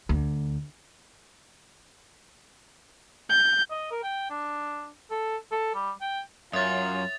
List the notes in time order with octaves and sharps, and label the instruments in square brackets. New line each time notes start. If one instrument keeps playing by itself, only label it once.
[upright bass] D2
[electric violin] G6
[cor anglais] D#5
A#4
G5
D4
A4
A4
G3
G5
[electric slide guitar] F#2 [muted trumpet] F4 [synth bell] C#5 E5 [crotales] D#6 A6